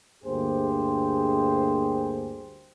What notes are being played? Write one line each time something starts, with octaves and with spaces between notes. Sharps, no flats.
D2 G2 A#3 G4 G#4 C5